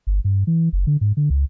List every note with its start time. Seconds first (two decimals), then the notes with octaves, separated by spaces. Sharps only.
0.07 G1
0.24 G2
0.47 E3
0.73 F#1
0.87 D3
1.01 G#2
1.17 D3
1.30 C#2